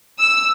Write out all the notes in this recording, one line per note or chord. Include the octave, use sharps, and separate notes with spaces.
E6